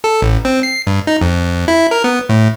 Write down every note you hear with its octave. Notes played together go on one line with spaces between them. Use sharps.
A4
A1
C4
C7
G2
D#4
F2
F2
E4
A#4
B3
A2